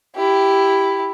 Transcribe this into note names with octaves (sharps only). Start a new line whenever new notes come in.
E4 G4